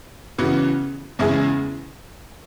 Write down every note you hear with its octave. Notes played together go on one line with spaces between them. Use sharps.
C#3 E3 B3 F#4
E2 C#3 G#3 E4 G#4